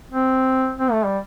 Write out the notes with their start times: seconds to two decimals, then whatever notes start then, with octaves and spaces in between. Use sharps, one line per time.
0.11 C4
0.79 C4
0.92 A3
1.05 G3